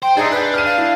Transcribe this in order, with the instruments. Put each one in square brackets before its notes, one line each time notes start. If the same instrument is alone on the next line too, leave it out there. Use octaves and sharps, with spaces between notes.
[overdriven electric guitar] C5 [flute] G5
[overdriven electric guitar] D4 [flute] D#4 [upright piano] G#4 E5
[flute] B4 [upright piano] F#6 G6
[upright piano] F6 D#7
[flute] F5
[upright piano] E4